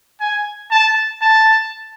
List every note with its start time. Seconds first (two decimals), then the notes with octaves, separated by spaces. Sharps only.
0.20 G#5
0.71 A5
1.22 A5